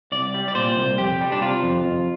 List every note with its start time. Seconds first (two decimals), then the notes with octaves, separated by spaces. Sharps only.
0.12 C2 D5
0.34 G3
0.48 D5
0.55 A#2 C5
0.77 C2
0.98 F2 G4
1.21 G3
1.32 D4
1.41 C3 F4
1.63 F2
1.85 F2